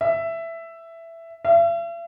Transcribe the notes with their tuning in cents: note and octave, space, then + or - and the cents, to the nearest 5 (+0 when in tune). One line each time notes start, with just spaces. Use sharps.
E5 +10
E5 +45